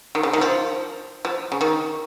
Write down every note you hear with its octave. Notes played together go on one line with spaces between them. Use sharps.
D#3
C#3
D#3
F3
F3
C#3
D#3